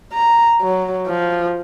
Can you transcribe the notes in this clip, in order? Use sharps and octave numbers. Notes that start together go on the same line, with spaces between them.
A#5
F#3
F3